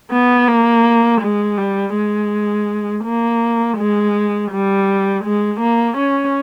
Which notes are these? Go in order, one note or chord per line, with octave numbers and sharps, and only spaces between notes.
B3
A#3
G#3
G3
G#3
A#3
G#3
G3
G#3
A#3
C#4